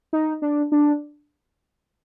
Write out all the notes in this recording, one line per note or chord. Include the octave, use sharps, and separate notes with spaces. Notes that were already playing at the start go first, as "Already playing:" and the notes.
D#4
D4
D4